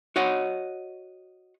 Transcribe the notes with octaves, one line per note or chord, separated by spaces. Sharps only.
F#4 C#5 D#5 F#5